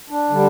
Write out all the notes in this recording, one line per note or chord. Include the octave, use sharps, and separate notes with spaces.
D4
D3 G3